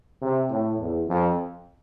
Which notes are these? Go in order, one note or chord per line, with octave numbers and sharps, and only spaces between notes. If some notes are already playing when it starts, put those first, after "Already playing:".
C3
A2
E2
F2